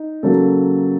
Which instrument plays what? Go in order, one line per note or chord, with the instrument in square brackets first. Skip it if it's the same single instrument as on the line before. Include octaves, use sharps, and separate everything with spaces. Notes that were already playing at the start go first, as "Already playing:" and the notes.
Already playing: [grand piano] D#4
C#3 F#3 A#3 C#4 A4